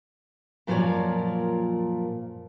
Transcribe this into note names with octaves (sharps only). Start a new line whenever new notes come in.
F#2 A#2 F3 A#4 C#5 D5